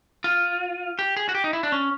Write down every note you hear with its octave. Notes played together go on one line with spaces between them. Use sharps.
F4
G4
G#4
F#4
G4
D#4
E4
D4
C#4